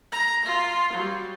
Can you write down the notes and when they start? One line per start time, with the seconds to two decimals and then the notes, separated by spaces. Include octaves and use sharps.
0.12 A#5
0.45 F4
0.93 F#3 G3